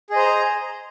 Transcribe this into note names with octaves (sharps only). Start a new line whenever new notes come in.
G#4 C5 D#5 A#5